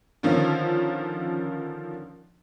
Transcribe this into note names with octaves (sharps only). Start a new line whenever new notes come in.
D3 D#3 F3 C#4